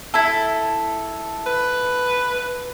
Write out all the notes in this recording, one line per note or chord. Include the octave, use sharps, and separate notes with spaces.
E4 A4
B4